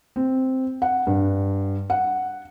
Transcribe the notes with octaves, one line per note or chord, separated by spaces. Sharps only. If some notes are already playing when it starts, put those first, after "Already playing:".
C4
F#5
G2
F#5